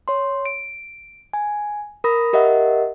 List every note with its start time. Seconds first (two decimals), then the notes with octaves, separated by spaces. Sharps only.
0.08 C#5 C6
0.46 D7
1.33 G#5
2.04 A#4 B5 D#6 A#6
2.33 G4 A#4 D#5 E5 F#5